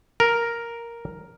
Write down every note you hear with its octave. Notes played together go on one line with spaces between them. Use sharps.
A#4